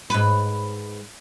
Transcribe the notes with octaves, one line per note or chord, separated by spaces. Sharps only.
G#2 B4